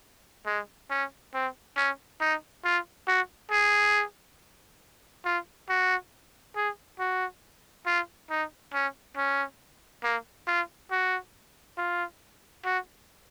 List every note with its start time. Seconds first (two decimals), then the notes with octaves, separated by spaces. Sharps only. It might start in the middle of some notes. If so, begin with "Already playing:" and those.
0.46 G#3
0.90 C#4
1.34 C4
1.77 C#4
2.21 D#4
2.64 F4
3.08 F#4
3.51 G#4
5.25 F4
5.69 F#4
6.56 G#4
6.99 F#4
7.86 F4
8.30 D#4
8.74 C#4
9.17 C#4
10.04 A#3
10.48 F4
10.91 F#4
11.78 F4
12.65 F#4